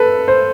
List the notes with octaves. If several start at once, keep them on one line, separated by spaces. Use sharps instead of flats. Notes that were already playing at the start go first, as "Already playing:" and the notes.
Already playing: A4 B4
C5